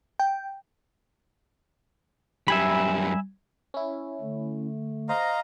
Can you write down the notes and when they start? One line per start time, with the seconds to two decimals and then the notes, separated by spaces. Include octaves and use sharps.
0.20 G5
2.48 F#2 G3 E5 G#5 B5
3.74 C#4 E4
4.20 D3 A3
5.09 C5 D#5 F5 A#5